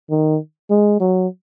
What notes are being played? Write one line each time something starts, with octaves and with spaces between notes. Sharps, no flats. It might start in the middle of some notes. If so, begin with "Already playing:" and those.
D#3
G#3
F#3